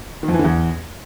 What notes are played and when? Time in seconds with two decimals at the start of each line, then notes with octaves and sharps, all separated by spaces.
0.23 D#3
0.28 F2
0.34 E3
0.39 D3
0.45 E2